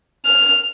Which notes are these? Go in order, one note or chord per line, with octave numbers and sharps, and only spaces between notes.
F6